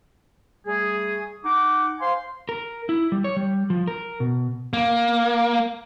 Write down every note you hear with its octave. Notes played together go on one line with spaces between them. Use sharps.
G3 A3 G#4
D#4 F#5 D6
C5 F5 G#5 C6
A#4
E4
G3
C#5
G3
F3
A#4
B2
A#3